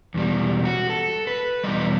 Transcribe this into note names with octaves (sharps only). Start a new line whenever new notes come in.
E2 B2 G3
F#4
A4
B4
E2 B2 G3 D#5